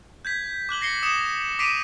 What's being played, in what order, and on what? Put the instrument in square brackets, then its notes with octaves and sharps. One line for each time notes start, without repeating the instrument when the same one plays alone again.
[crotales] G6 G#6 B6
D6 F#6 F#7 G7
A#6 C7 C#7 G7
D#6 C#7 E7
D6 B6 C7 D7 D#7 F7